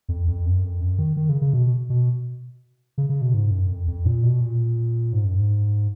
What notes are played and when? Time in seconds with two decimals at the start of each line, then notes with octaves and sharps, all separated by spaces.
0.09 F2
0.28 F2
0.46 F#2
0.63 F2
0.81 F#2
0.99 D#3
1.17 D#3
1.29 C#3
1.42 C#3
1.53 B2
1.90 B2
2.98 C#3
3.09 C#3
3.21 B2
3.34 G#2
3.51 F#2
3.70 F2
3.88 F2
4.05 A#2
4.23 B2
4.41 A#2
5.13 G#2
5.25 F#2
5.37 G#2